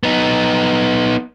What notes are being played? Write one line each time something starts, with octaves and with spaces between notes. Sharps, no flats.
B3 D#4